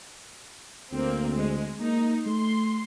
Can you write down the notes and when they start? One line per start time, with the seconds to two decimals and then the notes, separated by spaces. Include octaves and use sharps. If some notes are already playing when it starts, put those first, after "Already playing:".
0.92 D2 A#3 C4
1.34 G#3
1.81 A#3 D#4
2.26 A3 C6